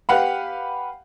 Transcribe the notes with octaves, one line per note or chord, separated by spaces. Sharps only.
G4 B4 F5 F#5 B5